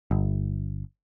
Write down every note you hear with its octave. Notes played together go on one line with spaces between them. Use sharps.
G1